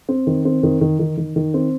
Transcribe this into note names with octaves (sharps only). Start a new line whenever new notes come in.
C4
D#3
C4
D#3
D#3
D#3
D#3
D#3
C4